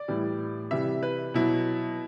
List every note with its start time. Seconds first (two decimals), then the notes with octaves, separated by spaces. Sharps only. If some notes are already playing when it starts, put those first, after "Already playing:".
Already playing: D5
0.08 A2 E3 G3
0.71 C3 E3 G3 E5
1.03 B4
1.34 B2 F#3 E4